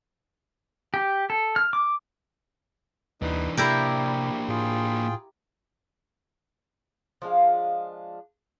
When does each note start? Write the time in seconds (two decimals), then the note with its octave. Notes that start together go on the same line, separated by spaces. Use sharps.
0.94 G4
1.30 A4
1.56 F6
1.73 D6
3.22 D#2 E3 D4 D#4 B4
3.57 C3 A#3 D4 E4 G4 A#4 D5
4.48 A2 F4 G#4 G5
7.22 F3 G#3 D4 F4